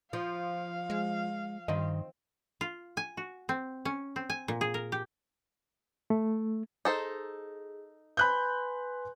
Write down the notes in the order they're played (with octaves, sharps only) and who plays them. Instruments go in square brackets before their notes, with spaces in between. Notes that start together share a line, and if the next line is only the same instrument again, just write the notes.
[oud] F3 [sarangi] F5
[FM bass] G#3
[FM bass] G2 [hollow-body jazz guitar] D#3 D#5 [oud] C4
[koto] F4
G#5
F#4
C4
C#4
C4
G#5
A#2
G#4
A#4
G4
[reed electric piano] A3
[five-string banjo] D#4 A4 C5 [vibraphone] G#4
[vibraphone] B4 G#5 C6 [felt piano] B5 F#6 G6